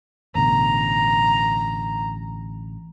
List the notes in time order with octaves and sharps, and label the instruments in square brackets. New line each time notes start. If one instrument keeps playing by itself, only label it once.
[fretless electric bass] A1 B2 D3 [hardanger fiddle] A#5